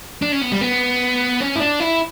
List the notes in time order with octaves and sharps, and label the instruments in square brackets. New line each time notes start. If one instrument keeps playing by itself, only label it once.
[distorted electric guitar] D4
C#4
B3
G3
B3
C#4
E4
D4
E4